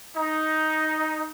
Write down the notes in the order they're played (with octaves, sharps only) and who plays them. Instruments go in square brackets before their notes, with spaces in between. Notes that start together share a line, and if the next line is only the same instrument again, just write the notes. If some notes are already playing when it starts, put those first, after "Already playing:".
[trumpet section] D#4